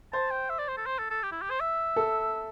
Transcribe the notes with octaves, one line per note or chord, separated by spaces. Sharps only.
C5 A5
G5
E5
D5
C5
A4
C5
A4
A4
G4
E4
G4
C5
E5
A4